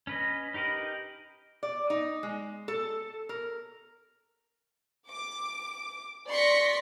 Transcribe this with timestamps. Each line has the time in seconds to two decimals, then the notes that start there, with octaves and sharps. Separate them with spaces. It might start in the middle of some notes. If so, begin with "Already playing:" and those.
0.07 C#4 B4 D#5
0.54 D#4 G4 A#4 B4 D#5
1.63 D5
1.90 D#4
2.23 G#3
2.68 A4
3.29 A#4
5.08 D6
6.30 D5 C6 C#6 A#6 B6 C#7